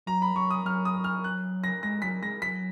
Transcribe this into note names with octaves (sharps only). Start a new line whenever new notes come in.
F#3 A#5
B5
F#3 C#6
D#6
F#3 F6
D#6
F6
F#6
A#6
G#3 A#6
F#3 B6
G#3 A#6
F#3 B6